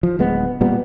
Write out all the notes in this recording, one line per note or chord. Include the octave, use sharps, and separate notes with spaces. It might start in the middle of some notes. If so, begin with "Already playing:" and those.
F3
D1 G#3 B3
A#2 G3 B3